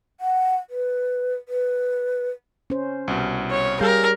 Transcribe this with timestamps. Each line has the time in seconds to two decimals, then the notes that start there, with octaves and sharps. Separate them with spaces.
0.20 F#5
0.70 B4
1.49 B4
2.70 C#4 C5
3.08 C2 B2
3.51 C#5
3.81 G3 G4 G#4 A#4 F5 G6